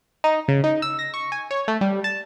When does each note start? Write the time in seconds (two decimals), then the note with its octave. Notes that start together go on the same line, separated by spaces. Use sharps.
0.24 D#4
0.48 C#3
0.64 D#4
0.82 E6
0.99 A#6
1.14 C#6
1.32 G#5
1.51 C#5
1.68 A3
1.81 G3
2.04 A5